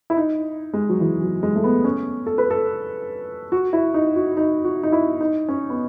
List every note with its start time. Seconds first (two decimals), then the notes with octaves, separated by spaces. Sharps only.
0.10 E4
0.17 D#4
0.73 G#3
0.89 F#3
1.00 E3
1.21 F#3
1.43 G#3
1.56 A3
1.64 B3
1.84 C#4
2.26 A4
2.38 B4
2.50 A4
3.52 F#4
3.73 E4
3.94 D#4
4.16 F#4
4.37 D#4
4.65 F#4
4.83 D#4
4.92 E4
5.21 D#4
5.48 C#4
5.70 B3